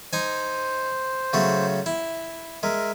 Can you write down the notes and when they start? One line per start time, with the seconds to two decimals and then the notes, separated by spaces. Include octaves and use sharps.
0.13 D#4 C5 G#5
1.33 C#3 F#3 A3
1.86 E4
2.63 G#3 A#4 E5